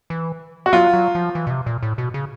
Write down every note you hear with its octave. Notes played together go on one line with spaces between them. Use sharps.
E3
F#4
F#3 F4
F#3
F3
E3
B2
C3
A#2
A2
B2
C#3